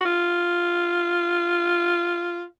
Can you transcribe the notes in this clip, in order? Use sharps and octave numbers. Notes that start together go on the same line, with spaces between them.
F#4
F4